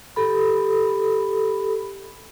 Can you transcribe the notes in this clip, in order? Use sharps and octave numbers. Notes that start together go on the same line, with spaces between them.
G4 A4 B5